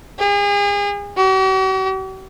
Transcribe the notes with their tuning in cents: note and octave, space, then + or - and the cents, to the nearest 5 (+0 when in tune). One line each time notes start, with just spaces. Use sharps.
G#4 -40
F#4 +45